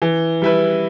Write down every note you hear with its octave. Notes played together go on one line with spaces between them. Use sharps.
E3
G3 E4 B4